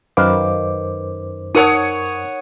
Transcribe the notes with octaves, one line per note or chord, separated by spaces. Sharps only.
F#2 D#3 B4 C5 F5 D6
D#4 A#4 C#5 F#5 A5 D#6